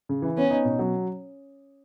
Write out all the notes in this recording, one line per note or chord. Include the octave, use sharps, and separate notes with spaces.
C#3
E3
B3 C#4
D#4
B2
F#3